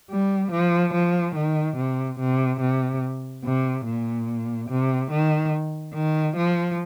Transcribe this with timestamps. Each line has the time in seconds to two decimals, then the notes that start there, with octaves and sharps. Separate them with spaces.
0.10 G3
0.51 F3
0.93 F3
1.36 D#3
1.77 C3
2.19 C3
2.60 C3
3.44 C3
3.86 A#2
4.70 C3
5.11 D#3
5.94 D#3
6.37 F3